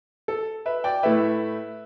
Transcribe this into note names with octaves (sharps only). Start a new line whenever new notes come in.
A4
B4 E5
D5 G5
A2 A3 E4 B4 E5